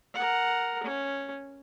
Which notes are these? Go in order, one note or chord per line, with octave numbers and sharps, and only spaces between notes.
A#4 F#5
C#4